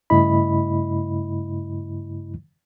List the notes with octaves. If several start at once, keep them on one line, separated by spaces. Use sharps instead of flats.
G2 C#3 A3 E4 D#5 B5